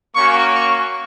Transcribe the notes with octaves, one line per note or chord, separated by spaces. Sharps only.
A#3 C#4 F#4 C#6
C#6